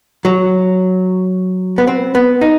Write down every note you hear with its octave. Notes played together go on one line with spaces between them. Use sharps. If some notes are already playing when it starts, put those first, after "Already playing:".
F#3
B3
C4
B3
D#4